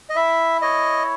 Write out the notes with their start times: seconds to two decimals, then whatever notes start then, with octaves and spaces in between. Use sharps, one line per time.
0.09 D#5
0.16 E4 E5
0.62 C#5 D#5